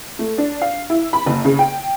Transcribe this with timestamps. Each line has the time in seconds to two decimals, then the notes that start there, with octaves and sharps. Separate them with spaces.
0.19 A3
0.38 D4
0.62 F5
0.90 E4
1.13 B5
1.26 F#1
1.45 C#3
1.59 G5